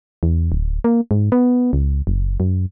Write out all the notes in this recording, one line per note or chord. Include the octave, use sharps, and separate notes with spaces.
E2
D1
A#3
G#2
B3
C#2
F#1
F#2